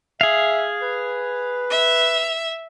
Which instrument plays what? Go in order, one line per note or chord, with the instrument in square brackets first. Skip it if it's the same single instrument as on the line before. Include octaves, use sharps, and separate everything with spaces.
[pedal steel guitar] G#4 F5 [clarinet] E5
[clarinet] B4
[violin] E5